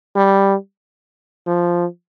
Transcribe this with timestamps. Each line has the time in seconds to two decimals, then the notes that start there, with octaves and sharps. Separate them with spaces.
0.16 G3
1.47 F3